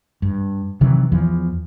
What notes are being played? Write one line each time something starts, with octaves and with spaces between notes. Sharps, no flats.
G2
C3 D#3 E3 F#3
E2 E3 F3